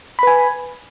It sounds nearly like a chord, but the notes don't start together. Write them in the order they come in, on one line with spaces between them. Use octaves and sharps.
B5 B4 G#5